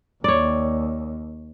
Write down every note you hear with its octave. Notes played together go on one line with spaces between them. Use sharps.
D#2 C#5 D5